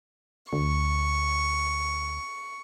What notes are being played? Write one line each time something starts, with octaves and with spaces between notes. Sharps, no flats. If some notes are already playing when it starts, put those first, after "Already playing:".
D2 C#6